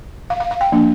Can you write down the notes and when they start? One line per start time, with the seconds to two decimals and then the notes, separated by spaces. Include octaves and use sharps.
0.30 F5
0.40 F5
0.51 F5
0.61 G5
0.72 F3 A#3 D4